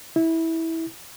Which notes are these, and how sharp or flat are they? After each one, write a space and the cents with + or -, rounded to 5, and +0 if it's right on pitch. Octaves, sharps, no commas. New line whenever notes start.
E4 -15